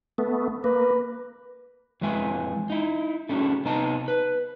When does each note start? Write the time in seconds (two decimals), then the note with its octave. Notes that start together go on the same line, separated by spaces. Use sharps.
0.18 A3 B3
0.64 A#3 B4
2.01 F2 E3 G#3 E5 G#5
2.70 D#4 E4
3.29 A3 C#4 D4 E4 F#4 G#4
3.65 C3 B3 D#4 D#5 A5
4.08 B4